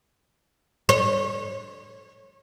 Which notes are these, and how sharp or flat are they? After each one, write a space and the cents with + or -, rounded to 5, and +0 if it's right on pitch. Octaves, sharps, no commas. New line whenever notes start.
C#5 -25